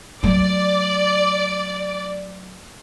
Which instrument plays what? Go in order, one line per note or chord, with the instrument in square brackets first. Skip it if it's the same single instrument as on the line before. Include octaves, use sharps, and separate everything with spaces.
[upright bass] F#3 A3 [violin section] D5